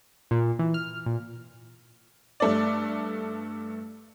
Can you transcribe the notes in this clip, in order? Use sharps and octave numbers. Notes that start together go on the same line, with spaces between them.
A#2
E3
F6
A#2
G2 A3 D5